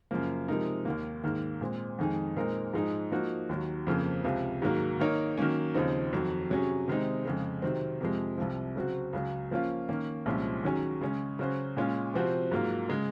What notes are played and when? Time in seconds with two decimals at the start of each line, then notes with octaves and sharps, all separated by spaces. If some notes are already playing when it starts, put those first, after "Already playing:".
0.11 F#2 C#3 F3 A#3
0.48 C3 F3 G#3 D#4 A#4
0.85 D#2 D#3 A#3
1.24 G#2 D#3 A#3
1.61 A#2 G#3 C4
1.98 F2 D#3 G#3 D#4 G#4
2.36 A#2 G#3 C4 D#4 A#4
2.73 G#2 F3 G#3 D#4
3.12 F3 A#3 D#4 F#4
3.49 D#2 D#3 F#3
3.87 F2 C#3 F3 A#3
4.24 C#2 C3 F3
4.62 G#2 D#3 F#3 A#3
4.99 D#3 A#3 D#4 A#4 C#5
5.37 D#3 F#3 A#3 C#4
5.74 D#2 C#3 F3 C4 D#4
6.13 F2 D#3 F#3
6.50 C3 F#3 C#4 G#4
6.88 C3 D#3 G#3 C4 D#4
7.25 F2 C#3 G#3
7.62 C3 D#3 F#3 C4
8.01 F2 C3 F3 G#3
8.38 C2 C3 F3
8.76 C#3 F#3 C4 F#4
9.13 C#2 C#3 F#3
9.51 F3 A#3 C#4 F4
9.89 D#3 A#3 C#4
10.26 C2 A#2 F3 G#3 C#4
10.64 D#3 F#3 C#4 G#4
11.01 C#3 G#3 C#4
11.39 C#3 F#3 C#4 F#4 C5
11.77 A#2 G#3 C#4 F4
12.14 C3 F3 C4 F#4 C5
12.52 G#2 F#3 A#3 F4
12.89 C#3 G#3